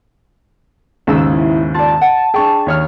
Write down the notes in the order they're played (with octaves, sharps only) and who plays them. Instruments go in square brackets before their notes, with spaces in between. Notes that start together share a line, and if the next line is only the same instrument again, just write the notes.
[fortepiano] D#2 G#2 C#3 [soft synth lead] E6
[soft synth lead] E4
[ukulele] F4 D5 [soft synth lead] A5
[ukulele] F#5
[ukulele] D4 G5 [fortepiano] G#4 C#6
[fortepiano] D#2 C#5 F6